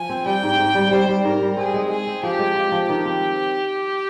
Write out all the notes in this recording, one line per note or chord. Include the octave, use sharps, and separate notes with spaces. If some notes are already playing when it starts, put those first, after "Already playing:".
Already playing: F3 G#5
C4
G3 G5
G#2
G#2
G3
G3 C5
G3
G#2 A#4
G3
C4 G#4
G#3
G#3 G#4
C4
F3 G4
G#3
F3
F3
D#3 G4
C4